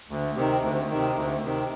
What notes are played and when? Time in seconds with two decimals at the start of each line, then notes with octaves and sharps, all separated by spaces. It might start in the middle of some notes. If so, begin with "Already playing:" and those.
0.09 D2
0.36 C3 D#3
0.62 D2
0.90 C3 D#3
1.16 D2
1.44 C3 D#3